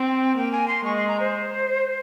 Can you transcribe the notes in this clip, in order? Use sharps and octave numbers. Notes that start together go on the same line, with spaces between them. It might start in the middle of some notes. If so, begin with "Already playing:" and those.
Already playing: C4 G5
A#3 G5
G#5
C6
G#3 C#6
C6
A#5
C5